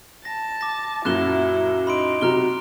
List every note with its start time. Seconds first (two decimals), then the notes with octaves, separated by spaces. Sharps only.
0.25 A5 A#6
0.61 D6 A#6
1.05 F#2 A#2 F#3 E4 F#6 E7 G7
1.87 D#4 B5 C6 D7
2.21 C3 F#3 A#5 F6 G7